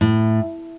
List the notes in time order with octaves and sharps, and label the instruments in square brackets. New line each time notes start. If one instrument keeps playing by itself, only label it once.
[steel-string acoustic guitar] A2